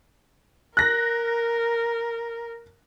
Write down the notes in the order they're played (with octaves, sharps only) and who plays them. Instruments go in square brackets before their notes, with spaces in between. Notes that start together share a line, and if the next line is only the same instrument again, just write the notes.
[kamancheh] A#4 [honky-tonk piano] F#6 A#6